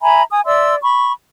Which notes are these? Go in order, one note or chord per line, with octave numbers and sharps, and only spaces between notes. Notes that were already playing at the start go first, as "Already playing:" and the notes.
E5 G#5 A#5 B5
G#5 D#6
D5 E5 C6 E6
B5 C#6